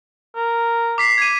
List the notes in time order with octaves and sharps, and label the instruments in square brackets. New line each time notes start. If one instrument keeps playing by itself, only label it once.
[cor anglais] A#4
[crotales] D6 B6 C7
G#6 D#7